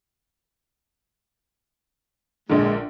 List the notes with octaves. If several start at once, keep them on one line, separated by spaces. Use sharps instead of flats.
A#1 A#2 D3 G#3